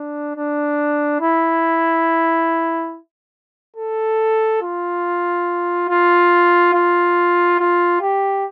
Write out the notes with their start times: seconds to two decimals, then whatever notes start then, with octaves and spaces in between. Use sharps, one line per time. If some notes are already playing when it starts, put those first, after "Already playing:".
Already playing: D4
0.36 D4
1.21 E4
3.77 A4
4.62 F4
5.89 F4
6.73 F4
7.59 F4
8.01 G4